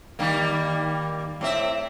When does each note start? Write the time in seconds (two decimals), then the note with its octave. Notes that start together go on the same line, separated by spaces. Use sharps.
0.19 D#3 G3 A#3
1.41 A2 C4 E5